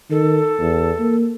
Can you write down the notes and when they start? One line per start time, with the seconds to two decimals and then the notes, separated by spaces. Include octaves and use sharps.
0.11 D#3 A4
0.59 E2
0.99 A#3